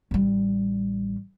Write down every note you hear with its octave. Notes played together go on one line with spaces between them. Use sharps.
A1 G3